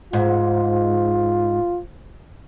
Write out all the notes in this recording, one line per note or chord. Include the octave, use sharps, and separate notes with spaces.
G#2 F4